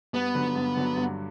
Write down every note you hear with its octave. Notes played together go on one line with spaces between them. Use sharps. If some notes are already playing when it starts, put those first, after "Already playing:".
G2 B3
D3 F#3
G2
D3 F#3
G2